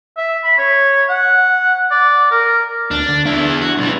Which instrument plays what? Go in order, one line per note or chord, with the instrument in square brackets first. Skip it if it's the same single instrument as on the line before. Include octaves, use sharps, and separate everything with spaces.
[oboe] E5
B5
C#5
F#5
D5
A#4
[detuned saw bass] D2 [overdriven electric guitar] D4
[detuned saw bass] D3
[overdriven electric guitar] E2 E4 [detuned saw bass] D4
[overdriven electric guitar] F#4
B1 E3